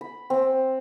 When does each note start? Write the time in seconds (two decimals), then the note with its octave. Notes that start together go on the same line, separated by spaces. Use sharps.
0.01 B5
0.30 C4